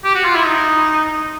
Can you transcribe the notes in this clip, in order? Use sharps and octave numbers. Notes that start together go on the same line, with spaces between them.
G4
F#4
F4
E4
D#4